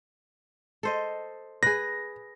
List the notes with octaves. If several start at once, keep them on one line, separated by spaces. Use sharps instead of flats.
A4 C5 D#5
G#4 B4 A#6